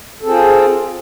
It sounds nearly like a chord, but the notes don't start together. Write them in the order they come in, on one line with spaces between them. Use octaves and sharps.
A4 C4 G#4 F4